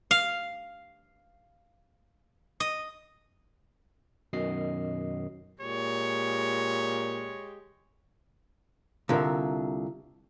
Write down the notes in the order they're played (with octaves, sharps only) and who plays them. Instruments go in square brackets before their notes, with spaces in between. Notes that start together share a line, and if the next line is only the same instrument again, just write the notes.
[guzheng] F5
D#5
[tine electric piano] F#2 B2 D#3 D#5 C7
[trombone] A#2 [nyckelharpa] G#3 G4 [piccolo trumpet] C#5
[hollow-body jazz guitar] C2 D3 [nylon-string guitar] F4 A#4 E5